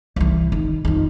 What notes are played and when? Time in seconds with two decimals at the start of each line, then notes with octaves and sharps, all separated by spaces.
0.16 C2 E3
0.52 D#3
0.85 F2 D#3